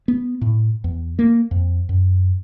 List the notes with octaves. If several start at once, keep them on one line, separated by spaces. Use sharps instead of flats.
B3
A2
E2
A#3
F2
F#2